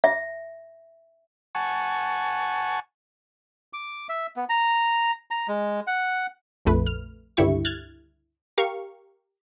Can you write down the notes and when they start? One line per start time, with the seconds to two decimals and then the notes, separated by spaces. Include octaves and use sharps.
0.04 E5
1.55 F#5 G#5 A5 C#6
3.73 D6
4.09 E5
4.36 B3
4.49 A#5
5.31 A#5
5.48 G#3
5.87 F#5
6.65 A#1 F2 A3 B4
6.86 F6
7.37 C#2 G2 D3 E4 G4 C#6
7.65 F6 F#6 G#6 A6
8.58 G4 A#4 F5 C#6